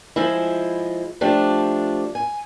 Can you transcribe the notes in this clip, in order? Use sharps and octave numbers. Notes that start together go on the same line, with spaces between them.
F3 G#3 E4
F3 A3 D4 G4
G#5